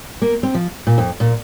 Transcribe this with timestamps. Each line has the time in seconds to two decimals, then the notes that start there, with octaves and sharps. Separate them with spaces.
0.22 A#3
0.43 C4
0.54 F3
0.87 A#2
0.98 F2
1.20 A#2